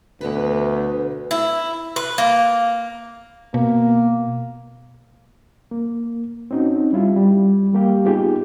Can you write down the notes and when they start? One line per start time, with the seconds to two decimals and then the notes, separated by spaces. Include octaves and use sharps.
0.21 D2 B2 B3 B4
1.31 E4
1.96 B4
2.18 A#3
3.54 B2 A#3
5.71 A#3
6.51 C4 C#4 D#4 F#4
6.93 G3 E4 F4
7.16 G3
7.73 G3 A#3 G4 F5
8.05 B3 D#4 F4 G4 G#4